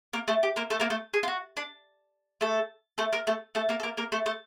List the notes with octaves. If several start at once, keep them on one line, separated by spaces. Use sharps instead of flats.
A#3 A#4
A3 A4
G4
A#3 A#4
A3 A4
A#3 A#4
A3 A4
G#4
F4
F#4
D4
A3 A4
A3 A4
A#3 A#4
A3 A4
A3 A4
A#3 A#4
A4
A#3 A#4
A#3 A#4
A3 A4
A3 A4